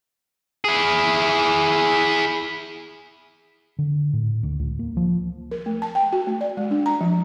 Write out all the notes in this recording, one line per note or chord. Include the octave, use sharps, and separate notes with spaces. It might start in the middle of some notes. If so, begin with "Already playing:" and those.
E4 G#4
D3
A2
D2
C#2
A#3
F3
A#4
A3
A5
G5
F#4
A3
D5
G#3
D4
A#5
F3